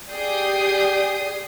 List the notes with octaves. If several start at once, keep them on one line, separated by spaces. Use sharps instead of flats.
G4 G#4 D5 D#6 G6 C7